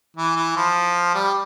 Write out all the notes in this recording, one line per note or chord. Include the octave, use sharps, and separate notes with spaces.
E3
E3
F3
G3